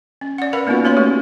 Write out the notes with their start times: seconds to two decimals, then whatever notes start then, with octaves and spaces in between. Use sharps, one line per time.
0.21 C#4
0.38 D5 F#5
0.53 A#4 B4 F5 F#5 B5
0.67 A#3 B3 C#4 D#4 F4 F#4
0.84 A#3 C#4 C#5 F5 C6
0.97 A3 F#4 G4